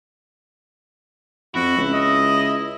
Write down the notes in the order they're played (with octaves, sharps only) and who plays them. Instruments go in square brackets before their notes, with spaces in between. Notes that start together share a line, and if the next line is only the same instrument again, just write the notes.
[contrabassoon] F2 [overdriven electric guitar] E4 [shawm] F#4
[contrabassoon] C#2
[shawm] D#5